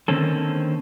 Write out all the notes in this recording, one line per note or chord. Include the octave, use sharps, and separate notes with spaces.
D3 D#3 A#3 C4 C#4 A4